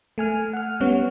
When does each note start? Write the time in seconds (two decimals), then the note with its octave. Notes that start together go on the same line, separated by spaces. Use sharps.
0.18 A3 G#5 F6
0.53 F#5 F6
0.80 G3 B3 C#4 C#5 F#5